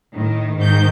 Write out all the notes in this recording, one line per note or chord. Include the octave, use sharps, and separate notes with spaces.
A2 D#3
G#2 D#3 G6